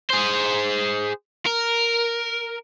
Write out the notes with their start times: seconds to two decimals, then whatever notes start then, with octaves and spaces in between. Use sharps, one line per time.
0.10 G#4 C5
1.46 A#4